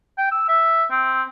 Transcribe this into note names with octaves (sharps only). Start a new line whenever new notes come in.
G5
E6
E5
C4